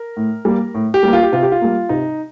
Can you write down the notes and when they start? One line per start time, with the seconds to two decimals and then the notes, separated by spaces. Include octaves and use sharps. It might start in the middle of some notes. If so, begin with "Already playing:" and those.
Already playing: A#4
0.17 A2
0.45 G3 A#3
0.74 A2
0.94 G4
1.03 G3 A#3
1.13 F4
1.23 G4
1.33 C3 F4
1.43 G4
1.52 F4
1.61 G3 A#3
1.89 C3 D#4